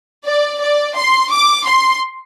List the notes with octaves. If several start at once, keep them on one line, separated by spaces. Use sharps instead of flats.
D5
D5
C6
D6
C6